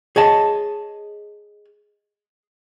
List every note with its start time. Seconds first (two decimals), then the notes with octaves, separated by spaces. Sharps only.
0.16 G#4 C#5 D#5 A5